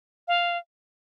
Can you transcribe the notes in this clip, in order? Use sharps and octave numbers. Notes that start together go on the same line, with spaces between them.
F5